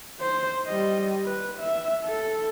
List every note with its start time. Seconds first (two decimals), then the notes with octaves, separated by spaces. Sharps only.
0.20 C5
0.66 G3 D#5
1.26 B4
1.60 E5
2.05 A4